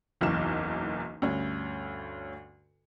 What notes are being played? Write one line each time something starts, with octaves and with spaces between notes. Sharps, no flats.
F#1 B1 E2 E3 F6 E7
D2 G2 C#4